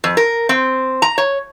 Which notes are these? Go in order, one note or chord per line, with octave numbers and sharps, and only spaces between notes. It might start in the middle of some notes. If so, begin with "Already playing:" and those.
F2
A#4
C4
A#5
C#5